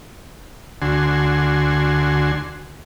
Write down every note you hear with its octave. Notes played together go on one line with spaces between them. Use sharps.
D2 D3 F#4 G#5 C6